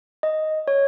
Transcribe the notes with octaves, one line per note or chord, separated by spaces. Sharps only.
D#5
C#5